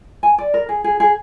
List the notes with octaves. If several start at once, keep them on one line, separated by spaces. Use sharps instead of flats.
G#5
D5
A#4
G#4
G#4
G#4